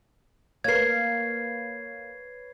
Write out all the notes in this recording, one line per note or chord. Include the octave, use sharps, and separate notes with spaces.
A#3 A#4 B4 C#5 G#6 C7